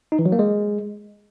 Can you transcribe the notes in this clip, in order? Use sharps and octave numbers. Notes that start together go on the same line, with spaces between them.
D#4
E3
F#3
A#3
G#3